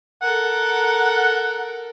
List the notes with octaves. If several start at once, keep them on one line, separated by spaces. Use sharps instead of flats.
A4 A#4 F#5